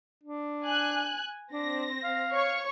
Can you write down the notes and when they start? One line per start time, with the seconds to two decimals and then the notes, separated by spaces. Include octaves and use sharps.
0.23 D4
0.66 G#5 F#6
1.53 C4 D4 A#6
2.04 F5
2.33 C#5 C#6